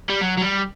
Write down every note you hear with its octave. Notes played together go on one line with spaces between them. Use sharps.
G3
F#3
F#3
G3